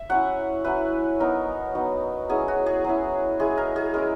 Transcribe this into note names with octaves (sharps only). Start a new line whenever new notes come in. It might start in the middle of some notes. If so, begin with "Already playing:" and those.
Already playing: E5
F#3 C#4 E4 F#5
F#3 C#4 E4 B4
F#3 B3 D#4 A#4
F#3 B3 D#4
F#3 C#4 E4 G#4
F#4
G#4
F#3 C#4 E4
G#3 C#4 E4 G#4
A#4
G#4
G#3 C#4 E4 A#4